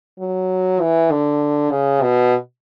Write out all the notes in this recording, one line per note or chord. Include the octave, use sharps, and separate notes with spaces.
F#3
E3
D3
C#3
B2